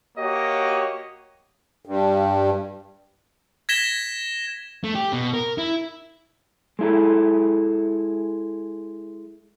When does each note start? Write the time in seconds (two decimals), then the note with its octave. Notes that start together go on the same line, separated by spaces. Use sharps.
0.17 A#3 F#4 G4 C#5 D#5
1.85 G2
3.69 G#6 A#6 B6 E7 G7
4.84 A3
4.95 G4
5.13 B2
5.33 A#4
5.58 E4
6.79 G#3 E4 A4